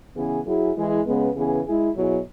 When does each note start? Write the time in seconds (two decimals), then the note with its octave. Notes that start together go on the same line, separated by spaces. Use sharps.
0.16 C#3 E3 B3 G#4
0.46 F#3 E4 G#4
0.76 E3 G#3 E4 G#4
1.06 C#3 G#3 B3
1.37 C#3 E3 B3 G#4
1.66 G#3 E4 G#4
1.97 B2 F#3 E4 G#4